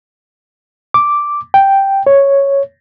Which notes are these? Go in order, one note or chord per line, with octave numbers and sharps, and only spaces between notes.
D6
G5
C#5